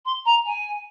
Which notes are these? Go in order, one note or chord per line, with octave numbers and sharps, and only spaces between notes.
C6
A#5
G#5